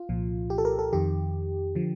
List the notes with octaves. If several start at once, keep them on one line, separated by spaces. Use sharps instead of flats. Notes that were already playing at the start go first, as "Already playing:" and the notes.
Already playing: F4
C2 A#2 F3
G4
A4
A#4
A4
F2 D#3 G4
D3 F3